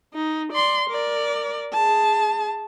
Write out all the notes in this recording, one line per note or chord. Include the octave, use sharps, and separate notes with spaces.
D#4
D5 C6
A#4 D5
G#4 A5